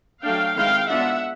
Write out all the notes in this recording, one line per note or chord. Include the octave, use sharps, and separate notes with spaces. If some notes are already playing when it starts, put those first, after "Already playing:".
F#3 A3 D4 F5 G5
D#3 G#3 C4 E4 F5 G5
G#3 B3 D4 F4 E5 F#5